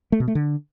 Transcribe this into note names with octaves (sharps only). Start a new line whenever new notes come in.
A3
B2
A3
D3